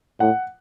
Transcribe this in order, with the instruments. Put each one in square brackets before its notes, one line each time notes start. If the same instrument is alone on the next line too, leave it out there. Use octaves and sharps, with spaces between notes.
[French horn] A2 [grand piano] F#5